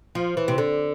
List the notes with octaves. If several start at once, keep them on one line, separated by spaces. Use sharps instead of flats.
F3
E3
C3
D3